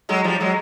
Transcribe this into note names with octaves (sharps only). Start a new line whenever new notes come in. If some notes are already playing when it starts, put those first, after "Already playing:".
F#3 G#3
F3 G3
F#3 G#3